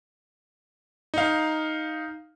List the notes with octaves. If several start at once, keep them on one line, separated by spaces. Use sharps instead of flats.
D#4 F5